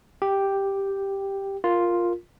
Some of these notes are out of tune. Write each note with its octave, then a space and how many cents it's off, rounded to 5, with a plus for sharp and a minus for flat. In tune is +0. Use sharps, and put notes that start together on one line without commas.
G4 +0 G5 +0
F4 +0 A#4 +0